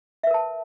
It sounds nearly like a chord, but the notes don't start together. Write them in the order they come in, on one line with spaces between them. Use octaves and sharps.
E5 B4 A#4 A5